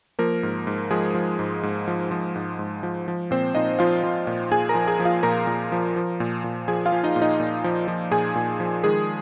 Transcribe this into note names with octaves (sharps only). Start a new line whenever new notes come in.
F3 A#3 A#4
G#2
G#2
F3 G#3 G#4
F3
G#2
G#2
F3
F3
G#2
G#2
F3
F3
A#2 C4 C5
A#2 D#4 D#5
F3 F4 F5
F3
A#2
A#2 G#4 G#5
A#4 A#5
F3
G#4 G#5
F3
F4 F5
A#2 A#4 A#5
A#2
F3
F3
A#2
A#2
F3 G#4 G#5
F4 F5
F3
D#4 D#5
A#2
D#4 D#5
A#2
F3
F3
A#2 G#4 G#5
A#2
F3
D#3 G#3 G#4